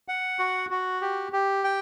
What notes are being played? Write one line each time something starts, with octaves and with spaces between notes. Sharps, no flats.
F#5
F#4
F#4
G4
G4
G5